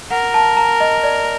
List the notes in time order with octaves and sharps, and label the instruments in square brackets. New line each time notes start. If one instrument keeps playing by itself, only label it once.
[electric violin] A#4 [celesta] F#5
[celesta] A5
A#5
D#5
D5